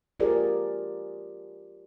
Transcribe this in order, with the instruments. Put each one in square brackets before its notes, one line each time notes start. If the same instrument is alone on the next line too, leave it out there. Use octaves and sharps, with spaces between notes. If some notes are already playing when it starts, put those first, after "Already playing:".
[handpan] F4 G4 G#4 A#4 C5 D5